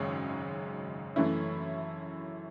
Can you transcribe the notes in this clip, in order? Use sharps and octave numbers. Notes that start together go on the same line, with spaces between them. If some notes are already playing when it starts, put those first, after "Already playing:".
Already playing: G#1 F#2 C#3 G#3 C#4
F#2 E3 A3 C#4 E4